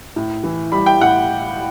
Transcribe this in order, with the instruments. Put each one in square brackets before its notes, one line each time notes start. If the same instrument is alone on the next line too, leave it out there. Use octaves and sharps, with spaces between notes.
[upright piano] A2
E3
G3 B5
G5
A2 F#5